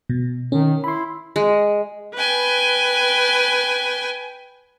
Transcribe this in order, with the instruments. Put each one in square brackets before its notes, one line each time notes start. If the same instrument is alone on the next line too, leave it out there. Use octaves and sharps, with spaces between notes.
[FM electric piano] B2
[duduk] D#3 [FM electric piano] C#4
[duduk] E4 [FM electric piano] B5 C6
[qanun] G#3
[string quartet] B4 G5 G#5